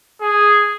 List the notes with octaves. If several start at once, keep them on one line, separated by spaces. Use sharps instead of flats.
G#4